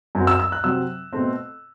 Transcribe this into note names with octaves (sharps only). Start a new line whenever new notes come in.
F#2 F#3 C4
E6
E6
F#6
C3 F#3 C4 E6
B2 A3 C4